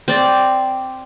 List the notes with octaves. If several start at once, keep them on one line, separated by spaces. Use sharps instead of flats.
C4 D5